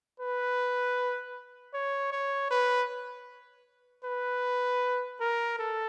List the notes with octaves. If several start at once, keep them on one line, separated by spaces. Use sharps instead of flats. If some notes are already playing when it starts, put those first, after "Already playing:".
B4
C#5
C#5
B4
B4
A#4
A4